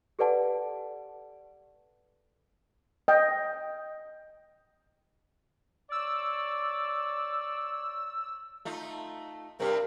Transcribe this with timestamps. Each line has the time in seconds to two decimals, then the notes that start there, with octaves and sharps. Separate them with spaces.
0.19 G4 A4 B4 D5 F#5 A5
3.08 D#5 G5
5.92 C#5 D5 E6
8.65 A3 D#4 F4
9.60 G2 C3 G3 A#4